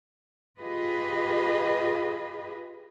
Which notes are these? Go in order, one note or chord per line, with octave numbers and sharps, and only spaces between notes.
F4 G4 G#4 B4 D#5